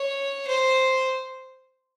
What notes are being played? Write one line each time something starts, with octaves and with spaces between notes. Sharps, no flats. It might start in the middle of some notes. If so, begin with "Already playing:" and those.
Already playing: C#5
C5